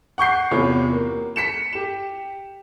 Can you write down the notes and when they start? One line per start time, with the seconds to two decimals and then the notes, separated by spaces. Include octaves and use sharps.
0.18 F#5 C#6 G6 C7
0.51 E2 C3 F4 C#5 B5
0.92 A#3
1.36 B6 C#7 E7
1.73 G4 E7